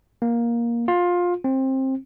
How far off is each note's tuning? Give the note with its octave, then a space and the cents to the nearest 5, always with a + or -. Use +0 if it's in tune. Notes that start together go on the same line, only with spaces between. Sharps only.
A#3 +10
F4 +20
C4 +20